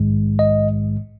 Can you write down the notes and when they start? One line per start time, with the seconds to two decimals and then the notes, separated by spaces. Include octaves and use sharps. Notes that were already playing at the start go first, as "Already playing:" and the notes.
Already playing: A#1 G#2 D#3 G#3
0.39 D#5